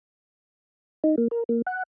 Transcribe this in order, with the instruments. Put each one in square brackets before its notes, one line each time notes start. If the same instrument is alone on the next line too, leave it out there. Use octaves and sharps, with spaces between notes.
[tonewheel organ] D#4
A#3
A#4
A#3
F#5